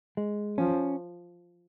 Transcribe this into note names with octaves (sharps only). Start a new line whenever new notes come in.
G#3
F3 C#4